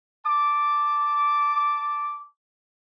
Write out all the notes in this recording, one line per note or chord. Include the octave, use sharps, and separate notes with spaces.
A5 D6